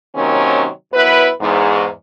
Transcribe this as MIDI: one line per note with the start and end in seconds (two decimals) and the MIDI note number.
0.15 0.67 48
0.15 0.67 51
0.15 0.67 54
0.15 0.67 58
0.15 0.67 60
0.15 0.67 61
0.94 1.28 42
0.94 1.28 59
0.94 1.28 64
0.94 1.28 71
1.40 1.86 40
1.40 1.86 44